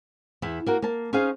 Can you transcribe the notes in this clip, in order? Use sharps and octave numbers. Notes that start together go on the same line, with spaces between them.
E2 E4
A#3 F#4 A#4
A#3 A5
C#4 D#4 G#4 C5 F5